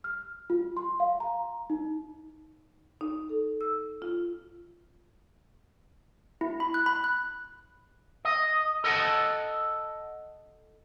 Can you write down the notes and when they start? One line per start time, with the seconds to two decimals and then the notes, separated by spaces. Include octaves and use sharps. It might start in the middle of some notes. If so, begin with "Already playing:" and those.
0.04 F6
0.50 F4
0.77 C6
1.00 F5
1.20 A#5
1.70 D#4
3.01 D#4
3.29 A4
3.61 E6
4.02 F4
6.41 E4
6.60 B5
6.74 F#6
6.86 B5
7.04 F#6
8.25 D#5
8.84 A4 D#5 F#5 A5